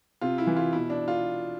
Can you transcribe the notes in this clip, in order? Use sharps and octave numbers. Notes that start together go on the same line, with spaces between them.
C3 F4
E4
E3
F4
B2 E4
D4
F4